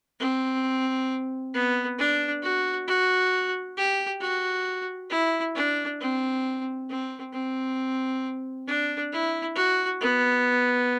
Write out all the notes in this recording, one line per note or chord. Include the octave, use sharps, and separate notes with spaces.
C4
B3
D4
F#4
F#4
G4
F#4
E4
D4
C4
C4
C4
D4
E4
F#4
B3